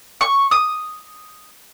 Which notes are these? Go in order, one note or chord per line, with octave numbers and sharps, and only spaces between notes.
C#6
D#6